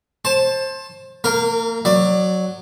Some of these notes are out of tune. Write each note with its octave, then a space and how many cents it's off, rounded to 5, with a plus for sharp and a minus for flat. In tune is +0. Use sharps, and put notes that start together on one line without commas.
C5 +25 A5 -5
A#3 -35 A#4 +0
F#3 +0 D5 +20